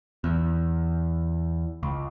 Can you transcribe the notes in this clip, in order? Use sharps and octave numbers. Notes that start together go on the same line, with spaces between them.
E2
C#2